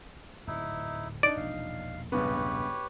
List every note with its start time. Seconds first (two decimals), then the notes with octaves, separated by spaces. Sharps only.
0.47 D1 F2 G#2 D#4 E4
1.23 D4 D#4 D5
1.37 E1 A#1 F5
2.12 C#2 G2 B3 G4 B4 C#5